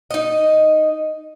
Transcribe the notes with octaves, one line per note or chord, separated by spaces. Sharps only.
D#4 D#5